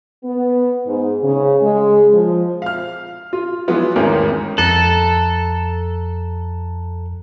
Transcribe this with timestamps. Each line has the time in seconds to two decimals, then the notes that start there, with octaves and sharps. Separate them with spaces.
0.24 B3
0.86 G#2
1.23 C#3
1.62 G#3
2.12 F3
2.62 F5 F6
3.33 F4
3.68 E3 F#3 G#3 B3 F4
3.96 A1 E2 G#2 D#3 C#4 A#4
4.58 F2 A4 A#5 F#6